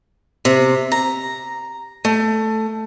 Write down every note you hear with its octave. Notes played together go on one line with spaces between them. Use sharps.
C3
A#5
A3